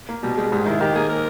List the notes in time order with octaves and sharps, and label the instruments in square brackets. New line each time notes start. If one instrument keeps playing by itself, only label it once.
[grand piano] A#3
[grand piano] B2 [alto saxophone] G3
[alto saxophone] G3 [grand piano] G#3
[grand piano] G#2 [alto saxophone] G3
[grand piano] D#3 [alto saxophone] E4
[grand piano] D#3 [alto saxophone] G4
[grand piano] A#3 [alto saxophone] G#4
[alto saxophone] A#4